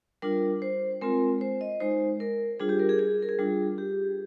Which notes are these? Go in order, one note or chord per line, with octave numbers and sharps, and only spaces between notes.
G3 D4 F4 A#4
C5
G#3 C4 F4 A#4
C5
D#5
G#3 D#4 C5
A#4
G3 D4 F4 G#4
G4
A#4
G#4
G#4
A#4
G#4
G3 D4 F4
G4